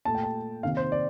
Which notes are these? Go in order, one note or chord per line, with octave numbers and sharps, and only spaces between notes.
A#2 A3 A5
G5
A5
C3 D#3 A#3 F5
C5
D5